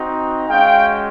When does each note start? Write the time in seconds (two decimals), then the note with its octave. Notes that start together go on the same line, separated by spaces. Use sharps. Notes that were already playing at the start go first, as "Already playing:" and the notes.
Already playing: C4 D#4 F#4
0.49 G#3 C#4 F#4 F5 G5